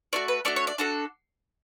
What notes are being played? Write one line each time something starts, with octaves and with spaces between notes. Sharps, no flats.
A3 D4 F#4 D5
B4
A3 D4 F#4 D5
C#5
D5
D4 F#4 A4